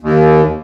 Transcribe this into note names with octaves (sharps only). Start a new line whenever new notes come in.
D#2